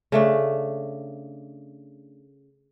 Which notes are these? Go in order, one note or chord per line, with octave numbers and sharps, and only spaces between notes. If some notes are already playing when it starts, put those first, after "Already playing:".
C#3 A3 D4